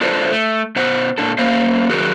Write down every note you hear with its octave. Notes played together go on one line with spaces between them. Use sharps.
D4 F4 A4 B4 C5 D5
A3
B2 C5 F#5
A#2 D4 A4
A3 A#3 C#4 C5 F5
D#3 F#3 F#4 G#4 A#4 B4